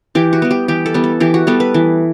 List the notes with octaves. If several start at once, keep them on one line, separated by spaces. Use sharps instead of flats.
E3 G4
F#4
G3 B3
G4
E3 G4
A4
G3 B3
A4
E3 G4
F#4
G3 B3 A4
B4
E3